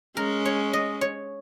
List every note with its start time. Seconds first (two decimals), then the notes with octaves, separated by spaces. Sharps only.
0.17 G#3 C#4 A#4
0.45 C#5
0.73 D#5
1.01 C#5